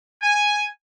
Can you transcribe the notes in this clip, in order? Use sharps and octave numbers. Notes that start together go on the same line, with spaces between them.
G#5